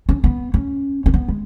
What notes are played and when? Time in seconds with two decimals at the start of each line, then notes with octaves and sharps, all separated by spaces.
0.09 C#4
0.24 B3
0.54 C#4
1.06 C#4
1.14 B3
1.28 G#3